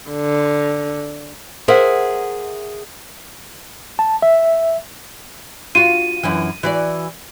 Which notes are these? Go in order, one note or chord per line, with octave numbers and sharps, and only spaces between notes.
D3
G#4 A#4 C5 E5 F#5
A5
E5
F4 F#4 D#7
F#2 E3
E3 F#4 D5